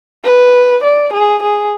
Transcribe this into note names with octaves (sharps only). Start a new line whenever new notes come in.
B4
D5
G#4
G#4